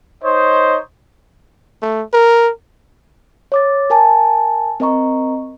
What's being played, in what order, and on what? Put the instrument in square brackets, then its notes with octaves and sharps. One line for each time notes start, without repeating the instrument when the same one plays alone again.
[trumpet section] D#4 C5 C#5 D#5
[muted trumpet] A3
A#4
[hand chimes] C#5 D6 A6
A#4 G#5 A5
C4 A#4 D#5 A#5 C#6